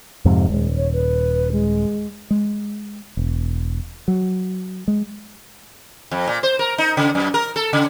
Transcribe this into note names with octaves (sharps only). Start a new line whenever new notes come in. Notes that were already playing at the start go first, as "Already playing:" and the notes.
F2 G#2 C3
D#1 G#1 G#3
C#5
B4
G#3
G#3
E1
F#3
G#3
F2
A#2
C5
A#4
D#4
C#3
F#2
A#4
A4
C#3